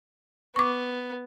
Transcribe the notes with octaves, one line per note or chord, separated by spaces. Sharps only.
B3 C#6 D6